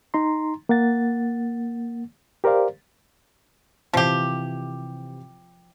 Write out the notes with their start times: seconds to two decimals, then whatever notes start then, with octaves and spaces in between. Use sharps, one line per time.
0.14 D#4 A#5 C6
0.69 A#3 F#5 A6
2.44 G4 A#4 C5 D5 F5
3.93 C3 E3 F3 G4